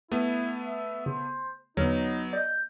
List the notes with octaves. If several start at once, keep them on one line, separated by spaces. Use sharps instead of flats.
A3 B3 E4
E5
C#3 C5
E2 D3 F#3 B3 D#4 F6
D5 D#5 G6